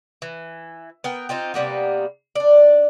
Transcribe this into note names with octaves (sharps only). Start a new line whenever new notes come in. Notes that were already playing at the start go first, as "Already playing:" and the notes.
E3
B3 A#4 G5
C4 D#4 F4 G4
C3 G3 A#3 B3
D4 D5